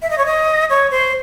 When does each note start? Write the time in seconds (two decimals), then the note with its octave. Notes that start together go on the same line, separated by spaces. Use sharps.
0.02 E5
0.10 D#5
0.18 C#5
0.26 D#5
0.70 C#5
0.91 C5